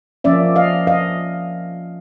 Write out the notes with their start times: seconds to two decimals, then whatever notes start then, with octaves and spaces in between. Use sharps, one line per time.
0.24 F3 A#3 C#4 D5 E5
0.56 D#5 F5
0.87 D#5 F5